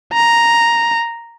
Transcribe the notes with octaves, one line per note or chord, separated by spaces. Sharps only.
A#5